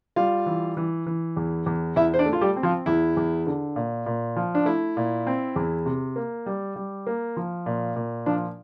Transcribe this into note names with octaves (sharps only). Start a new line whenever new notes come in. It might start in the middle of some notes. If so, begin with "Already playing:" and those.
G3 F4 F5
E3
E3
E3
E2
E2
E2 E4 E5
C5
D4 D5
A3
F4
G3 G4
C4
F3 F4
E2 E4
E2
D3
A#2
A#2
F3
D4
A3 E4
A#2
C4
E2
C3
A#3
G3
G3
A#3
F3
A#2
A#2
F3 D4